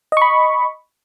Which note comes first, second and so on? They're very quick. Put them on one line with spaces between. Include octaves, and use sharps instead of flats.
D#5 C#6 B5